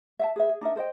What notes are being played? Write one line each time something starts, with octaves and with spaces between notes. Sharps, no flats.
E5 F5 A5
G#4 B4 E5
G#4
D4 D#4 A#4 E5
A4 C5 D#5 G5